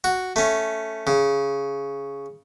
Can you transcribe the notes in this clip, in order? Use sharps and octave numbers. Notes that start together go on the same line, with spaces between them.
F#4
A3 C#4
C#3